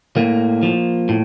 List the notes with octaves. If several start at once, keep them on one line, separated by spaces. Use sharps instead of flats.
A2 A#3
F3
A2